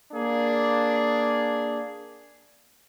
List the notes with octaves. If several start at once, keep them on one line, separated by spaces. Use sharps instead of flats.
A#3 D4 G#4